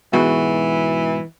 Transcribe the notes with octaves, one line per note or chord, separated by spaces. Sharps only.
G#2 B2 E3 F#4